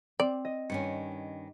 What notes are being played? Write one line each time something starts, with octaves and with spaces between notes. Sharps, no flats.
C4 D5
D#5
G2 D#3 C#4 C#7